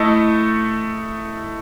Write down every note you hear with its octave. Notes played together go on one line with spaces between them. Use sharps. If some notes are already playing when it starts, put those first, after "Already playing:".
Already playing: A3 E4 A4 D#5